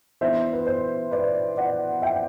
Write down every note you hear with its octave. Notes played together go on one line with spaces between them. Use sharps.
E3 B3 D4 C5 E5
B4
C5
B4 D5
D5 F#5
E5 G5